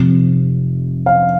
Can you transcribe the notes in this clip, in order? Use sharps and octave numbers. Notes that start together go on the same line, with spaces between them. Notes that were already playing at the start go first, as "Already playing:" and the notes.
Already playing: F1 F2 C3
F5